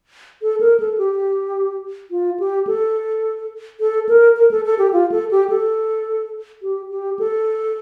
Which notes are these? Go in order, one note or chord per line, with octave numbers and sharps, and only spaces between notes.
A4
A#4
A4
G4
F4
G4
A4
A4
A#4
A#4
A4
A4
G4
F4
A4
G4
A4
G4
G4
A4